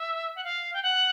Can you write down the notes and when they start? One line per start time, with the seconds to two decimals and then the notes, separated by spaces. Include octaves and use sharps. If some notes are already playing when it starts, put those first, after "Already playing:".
Already playing: E5
0.36 F#5
0.44 F5
0.74 G5
0.83 F#5